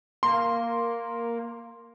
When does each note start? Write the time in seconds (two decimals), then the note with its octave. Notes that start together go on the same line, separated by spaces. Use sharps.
0.23 A#3 C6